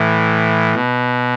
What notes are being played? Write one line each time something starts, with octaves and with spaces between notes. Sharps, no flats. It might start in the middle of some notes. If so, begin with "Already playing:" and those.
Already playing: A2 E3
B2